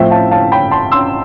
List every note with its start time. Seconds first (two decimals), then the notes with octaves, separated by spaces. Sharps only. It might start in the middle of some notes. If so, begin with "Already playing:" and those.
Already playing: A2 F3 A3 C4 E5 G5
0.11 F5 A5
0.31 F5 A5
0.52 G5 B5
0.71 A5 C6
0.92 C6 E6